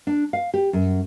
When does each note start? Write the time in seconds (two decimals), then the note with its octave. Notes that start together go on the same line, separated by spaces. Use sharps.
0.07 D4
0.33 F5
0.54 G4
0.73 F#2